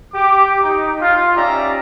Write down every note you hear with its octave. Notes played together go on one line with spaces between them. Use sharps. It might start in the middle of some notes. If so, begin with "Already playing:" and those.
G4 D6
D#4
F4
C#4 D#4 G4 D5 E5 A#5